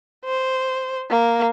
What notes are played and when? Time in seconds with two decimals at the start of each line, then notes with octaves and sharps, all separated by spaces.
0.25 C5
1.10 A#3